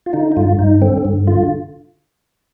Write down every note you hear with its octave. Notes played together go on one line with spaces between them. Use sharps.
F4
D3 D#4
D#4
G2 F4
G2 D#4
D3 C4
G2
D3 F4